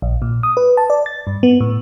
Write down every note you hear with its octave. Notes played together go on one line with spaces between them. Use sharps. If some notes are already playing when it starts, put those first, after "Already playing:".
A#1
A#2
D#6
B4
A5
D5
A6
G2
B3
A2